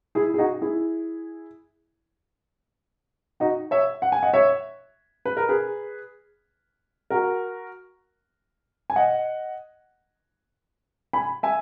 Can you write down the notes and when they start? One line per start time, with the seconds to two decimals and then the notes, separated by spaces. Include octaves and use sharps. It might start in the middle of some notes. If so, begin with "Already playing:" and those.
0.15 E4 G#4
0.34 G#4
0.38 D#4 F#4
0.61 E4 G#4
3.40 D#4 F#4
3.71 C#5 E5
4.02 F#5
4.12 G#5
4.23 D#5 F#5
4.33 C#5 E5
5.25 B4
5.37 A#4
5.49 G#4 B4
7.10 F#4 A#4
8.90 G#5
8.96 D#5 F#5
11.13 G#5 B5
11.43 E5 G#5